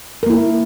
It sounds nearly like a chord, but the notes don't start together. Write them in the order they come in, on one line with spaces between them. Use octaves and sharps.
A#4 A#3 E4